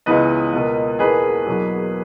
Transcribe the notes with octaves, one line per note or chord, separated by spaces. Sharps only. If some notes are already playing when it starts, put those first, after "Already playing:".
C#2 C#3 E3 B3 B4 D#5
C#2 B2 A#3
E1 E2 B2 A#3 G#4 B4
E2 B2 F#3 A#3